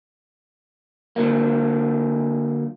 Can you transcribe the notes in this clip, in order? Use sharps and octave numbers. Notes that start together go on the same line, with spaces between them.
D3 F#3 A#3